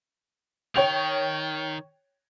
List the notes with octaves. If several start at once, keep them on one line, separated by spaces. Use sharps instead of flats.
D#3 C#5 G5 F7